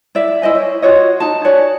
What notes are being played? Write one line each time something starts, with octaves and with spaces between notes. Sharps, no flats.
E4 D5 E5
E4 C5 D#5 G#5
C#5
F4 F#4 C#5 D#5
D#4 A5
F#4 C#5 D5 G#5